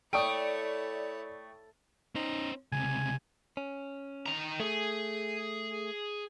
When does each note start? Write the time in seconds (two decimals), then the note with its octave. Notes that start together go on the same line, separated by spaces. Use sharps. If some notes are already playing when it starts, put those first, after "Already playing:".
0.13 A3 E4 C#5 D5 G5 C#6 D#6 D7
2.15 C#4 D#4 C5
2.72 C#2 C3 G#5
3.57 C#4
4.26 D#3 A#5
4.60 A3 G#4